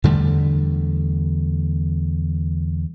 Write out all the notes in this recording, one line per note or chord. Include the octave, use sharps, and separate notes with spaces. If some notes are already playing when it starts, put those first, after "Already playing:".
E2 D3 G3 A3